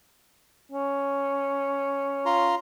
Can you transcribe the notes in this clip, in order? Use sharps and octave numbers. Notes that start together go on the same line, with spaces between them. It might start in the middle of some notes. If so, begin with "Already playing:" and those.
C#4
F4 A#5 C6